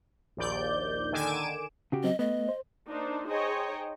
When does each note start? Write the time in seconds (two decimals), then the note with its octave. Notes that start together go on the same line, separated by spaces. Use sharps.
0.37 A#1 D#2 D5 G6
1.12 D3 D#3 G#5 D6 D7 E7
1.92 C#3 F#4 G4
2.04 F#3 C4 D#5
2.19 A3 B3 D#5
2.49 C5
2.88 A#3 D4 D#4 C5
3.27 D#4 G#4 C5 C#5 D#5 G5